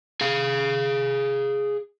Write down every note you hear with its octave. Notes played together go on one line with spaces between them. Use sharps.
G#4 F5